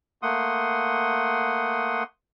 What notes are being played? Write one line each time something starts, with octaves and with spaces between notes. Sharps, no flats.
A3 A#3 F#5 C6 D#6